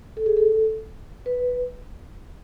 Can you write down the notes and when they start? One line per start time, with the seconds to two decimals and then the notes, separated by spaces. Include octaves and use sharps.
0.17 A4
0.26 G#4
0.37 A4
1.26 B4